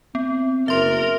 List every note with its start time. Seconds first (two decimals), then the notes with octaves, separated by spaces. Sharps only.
0.15 B3 C4
0.68 F#1 A#4 E5 C6